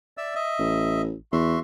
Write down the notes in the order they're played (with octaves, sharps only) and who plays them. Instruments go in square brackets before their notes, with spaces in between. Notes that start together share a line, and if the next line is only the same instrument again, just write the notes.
[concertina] D5 E5 E6
D#5 E5
[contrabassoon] A1
[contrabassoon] E2 [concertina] F#4 E5 C6